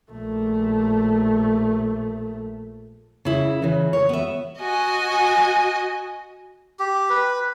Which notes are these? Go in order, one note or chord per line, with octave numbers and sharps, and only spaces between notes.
A#1 A3
C#3 E4
C#3 E3
C#5
B3 E5
F#4 D#5 G#5
G4
B4